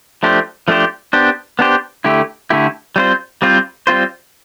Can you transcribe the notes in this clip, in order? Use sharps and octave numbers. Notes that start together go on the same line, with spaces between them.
F3 A3 D4 G4 C5
F3 A3 D4 G4 C5
B3 D4 G4 C5
B3 D4 G4 C5
D3 A3 E4 G4
D3 A3 E4 G4
G3 C4 F4 C5
G3 C4 F4 C5
G3 C4 F4 C5